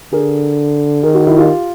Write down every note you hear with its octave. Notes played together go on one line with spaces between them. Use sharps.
D3 G#4 A#4
D#3 G#4 A#4
F#4 G#4
E4 F#4
F4 G4